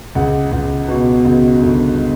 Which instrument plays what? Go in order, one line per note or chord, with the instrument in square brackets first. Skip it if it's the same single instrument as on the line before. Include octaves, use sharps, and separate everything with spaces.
[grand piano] C#2 F#5
C#2
B2
C#2
G1